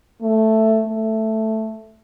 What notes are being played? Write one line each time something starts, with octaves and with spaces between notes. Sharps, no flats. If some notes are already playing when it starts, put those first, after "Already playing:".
A3
A3